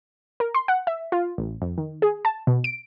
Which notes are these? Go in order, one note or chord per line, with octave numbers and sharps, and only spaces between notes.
A#4
C6
F#5
E5
F4
A1
F2
D#3
G#4
A5
B2
D7